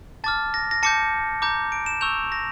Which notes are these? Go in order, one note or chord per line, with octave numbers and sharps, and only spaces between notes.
A5 D6 F6 A6
A#6
A#6
A5 D6 G6 C#7
A#5 D6 G6
D7
E7
C#6 E6 G6 F7
A#6